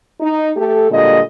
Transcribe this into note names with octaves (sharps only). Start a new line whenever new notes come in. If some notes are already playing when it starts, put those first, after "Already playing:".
D#4
A3 G4 A4
A#2 D3 G3 G#3 D#5